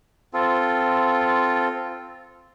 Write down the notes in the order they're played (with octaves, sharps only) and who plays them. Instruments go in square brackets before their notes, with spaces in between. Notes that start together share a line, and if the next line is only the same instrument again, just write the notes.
[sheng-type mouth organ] C4 F4 A4